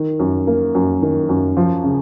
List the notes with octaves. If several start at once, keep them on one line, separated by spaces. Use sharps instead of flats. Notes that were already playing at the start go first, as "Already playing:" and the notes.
Already playing: D#3
F#2
A#3
F#2
D#3
F#2
F3
C#3